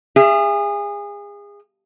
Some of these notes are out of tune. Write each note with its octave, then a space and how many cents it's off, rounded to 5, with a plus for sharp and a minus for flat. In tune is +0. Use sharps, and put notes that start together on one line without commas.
G#4 -30 E5 +30